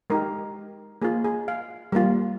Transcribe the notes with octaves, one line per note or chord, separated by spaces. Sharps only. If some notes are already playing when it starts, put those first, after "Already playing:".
G#3 D#4 G4 A#4
A#3 F4 G#4
G#4
F5
G3 A#3 F4